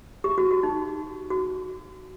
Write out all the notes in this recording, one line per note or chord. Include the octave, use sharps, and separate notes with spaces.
G4
F#4
F#4
D#4
F#4